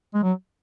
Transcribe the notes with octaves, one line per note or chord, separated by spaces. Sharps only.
G#3
F#3